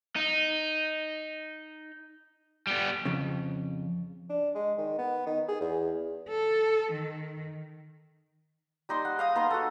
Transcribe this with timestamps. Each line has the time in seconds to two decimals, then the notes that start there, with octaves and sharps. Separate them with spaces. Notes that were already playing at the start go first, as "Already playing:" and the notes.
0.16 D#4
2.67 G3 B3
3.05 F2 C#3
4.30 D4
4.55 G#3
4.78 D#3
4.98 B3
5.26 D#3
5.49 G#4
5.61 E2
6.29 A4
6.92 D#3
8.89 G3 D#4 C6
9.05 F#5
9.18 G#4 F5 A#5 D#6
9.35 B3 D#4 A#5 C6
9.50 F#4 A4